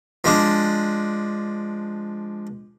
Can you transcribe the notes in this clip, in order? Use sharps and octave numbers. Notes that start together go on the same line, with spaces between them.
F3 G#3 D4